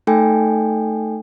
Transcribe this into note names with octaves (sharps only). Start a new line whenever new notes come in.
A3 D#4 A4 G5 G#5